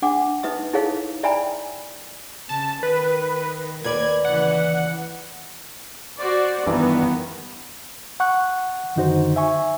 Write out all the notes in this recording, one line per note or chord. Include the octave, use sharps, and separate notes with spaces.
D4 F#5 D6
D#4 B4 E5 D#6
D#4 E4 G#4 A4 C#5 F5
D5 E5 G5 G#5 A#5 B5
C#3 A5
D#3 B4
D#2 A#3 B4 D5 G#6
C#3 E3 F#5
F#4 C5 D5
G2 D#3 E3 B3 D#4
F#5 C#6 F#6
F#2 D3 D#3 D#4 F#4 C5
E5 G#5 C#6